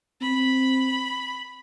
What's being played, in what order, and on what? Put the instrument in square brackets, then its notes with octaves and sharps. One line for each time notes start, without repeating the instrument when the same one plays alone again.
[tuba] C4 [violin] B5